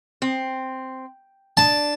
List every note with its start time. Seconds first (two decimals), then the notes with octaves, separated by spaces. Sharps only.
0.22 C4
1.57 D4 A5